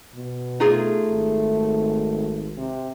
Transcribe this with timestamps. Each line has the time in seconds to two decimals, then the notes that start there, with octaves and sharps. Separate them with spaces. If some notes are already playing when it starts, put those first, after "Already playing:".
0.14 B2
0.60 A3 D#4 F4 G#4
1.09 G#1
2.57 C3